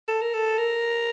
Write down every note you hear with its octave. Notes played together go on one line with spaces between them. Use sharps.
A4
A#4
A4
A#4